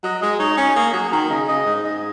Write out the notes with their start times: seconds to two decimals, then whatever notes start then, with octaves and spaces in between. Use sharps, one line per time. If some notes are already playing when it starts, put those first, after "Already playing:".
0.03 F#3 D#5
0.21 G#3 D#5
0.39 D#4 C#5
0.50 D#5
0.57 C#4 C#5
0.75 A#3 G#4
0.93 F#3 G#4
1.12 D#3 A#4
1.30 C#3 D#5
1.48 C#3 D#5
1.66 G#2
1.84 G#2 D#5